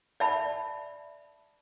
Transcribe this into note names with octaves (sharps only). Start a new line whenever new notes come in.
D5 E5 A5 B5